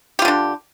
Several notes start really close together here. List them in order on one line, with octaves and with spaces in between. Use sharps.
G4 F4 D3 D4